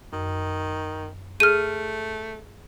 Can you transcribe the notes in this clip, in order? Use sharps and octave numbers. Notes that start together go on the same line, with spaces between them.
F#2 D#3
A3 G#4 F6 D#7